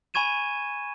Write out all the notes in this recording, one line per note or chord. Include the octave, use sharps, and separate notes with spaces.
G#5 B5 C#6 G#6 D#7 E7